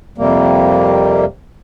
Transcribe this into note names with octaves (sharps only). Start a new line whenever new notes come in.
F2 C3 G3 A#3